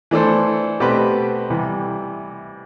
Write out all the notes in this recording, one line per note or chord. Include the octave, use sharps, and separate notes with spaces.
E3 A3 D4 A4 C5
B2 A3 C4 G4 B4
C3 E3 G3